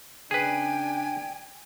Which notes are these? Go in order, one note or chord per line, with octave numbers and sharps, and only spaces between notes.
C#3 D4 G#4 B4 G5 G#5